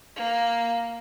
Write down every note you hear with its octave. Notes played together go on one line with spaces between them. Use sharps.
A#3